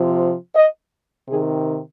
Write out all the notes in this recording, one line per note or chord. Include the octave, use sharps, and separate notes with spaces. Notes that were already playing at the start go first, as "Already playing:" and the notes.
Already playing: C3 F3
D#5
C3 D#3 G#4